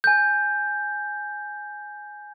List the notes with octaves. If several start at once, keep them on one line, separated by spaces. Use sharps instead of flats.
G#5 G6